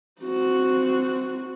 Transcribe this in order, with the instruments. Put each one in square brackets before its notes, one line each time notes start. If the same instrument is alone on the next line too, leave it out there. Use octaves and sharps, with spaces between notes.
[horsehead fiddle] C4 F#4